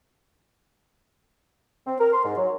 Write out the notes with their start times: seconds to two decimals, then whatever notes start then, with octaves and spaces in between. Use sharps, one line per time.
1.86 C4
2.00 A#4
2.13 C6
2.25 G#2
2.37 F#3